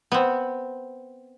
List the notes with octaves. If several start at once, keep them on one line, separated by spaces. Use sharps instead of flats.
B3 C4